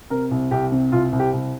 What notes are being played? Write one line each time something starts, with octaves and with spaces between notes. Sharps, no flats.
C3 A#4
C2
C2 G4
C3
C2 F4
C2
G4
C2